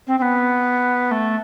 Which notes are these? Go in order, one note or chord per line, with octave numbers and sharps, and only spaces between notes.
C4
C4
B3
A3